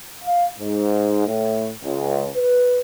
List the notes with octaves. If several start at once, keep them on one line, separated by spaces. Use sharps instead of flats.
F5
G#2
A2
C#2
B4